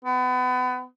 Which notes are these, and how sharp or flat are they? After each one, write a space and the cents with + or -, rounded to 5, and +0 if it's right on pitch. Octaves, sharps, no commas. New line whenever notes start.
B3 +30